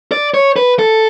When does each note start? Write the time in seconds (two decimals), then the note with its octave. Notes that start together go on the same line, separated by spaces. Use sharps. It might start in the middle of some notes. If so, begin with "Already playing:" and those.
0.12 D5
0.34 C#5
0.56 B4
0.79 A4